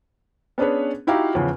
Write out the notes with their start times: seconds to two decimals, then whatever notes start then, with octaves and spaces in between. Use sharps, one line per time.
0.58 B3 C#4 D4 G#4 B4 C#5
1.07 D#4 E4 F#4 G4 F5 A#5
1.35 E2 C#3 F3 C#4